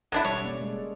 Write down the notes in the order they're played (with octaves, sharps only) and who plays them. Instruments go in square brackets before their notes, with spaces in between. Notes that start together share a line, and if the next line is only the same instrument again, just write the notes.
[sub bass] A1 [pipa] F#3 D4 E4 [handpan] A4
[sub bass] E1 [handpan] G3 [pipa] C#5
[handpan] A#3 C#4 D5
G#3